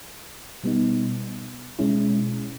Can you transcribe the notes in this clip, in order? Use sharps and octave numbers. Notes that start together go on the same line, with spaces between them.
B2 G3 B3 D#4
B2 G#3 C#4 E4